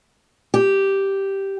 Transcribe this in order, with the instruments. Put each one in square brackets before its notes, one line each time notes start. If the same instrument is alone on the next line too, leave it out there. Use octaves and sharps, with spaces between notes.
[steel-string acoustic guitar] G4